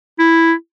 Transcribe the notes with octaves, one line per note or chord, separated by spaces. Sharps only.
E4